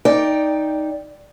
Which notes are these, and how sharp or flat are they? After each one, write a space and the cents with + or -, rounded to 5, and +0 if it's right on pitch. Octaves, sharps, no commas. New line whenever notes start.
D#4 +0 D5 -5 G5 +10